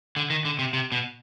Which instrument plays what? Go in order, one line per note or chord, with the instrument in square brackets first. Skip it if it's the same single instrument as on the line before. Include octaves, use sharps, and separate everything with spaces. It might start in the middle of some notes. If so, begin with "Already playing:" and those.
[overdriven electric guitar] D3
D#3
D3
C3
C3
B2